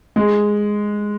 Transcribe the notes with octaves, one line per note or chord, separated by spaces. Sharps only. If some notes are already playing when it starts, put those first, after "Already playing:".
G#3